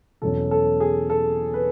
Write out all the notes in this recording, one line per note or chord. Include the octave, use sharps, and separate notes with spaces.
E2 B2 F#3 C#4 A4
A4
G#4
A4
B4